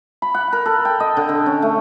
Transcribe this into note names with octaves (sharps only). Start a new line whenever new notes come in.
B5
F#5
A#4
A4
G5
D#5
D3
D3
C#4
A3